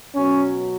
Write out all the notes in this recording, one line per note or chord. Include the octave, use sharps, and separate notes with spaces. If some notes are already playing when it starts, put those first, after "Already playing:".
B2 F#3 C#4